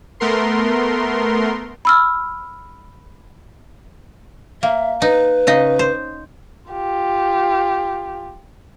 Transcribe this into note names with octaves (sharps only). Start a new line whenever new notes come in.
A3 B3 A#4 C6
B5 E6 F6
A#3 E5
D#4 B4
C#3 D#4 D#5
C5
F4 G4